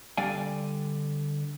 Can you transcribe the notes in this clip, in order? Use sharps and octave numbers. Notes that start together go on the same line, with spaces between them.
D3 G3 D5 F5 G5 G#5